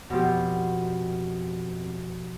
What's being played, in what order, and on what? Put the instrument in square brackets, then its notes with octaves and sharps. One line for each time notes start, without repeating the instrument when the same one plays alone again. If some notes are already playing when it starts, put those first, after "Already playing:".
[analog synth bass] F2 [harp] B2 F3 G4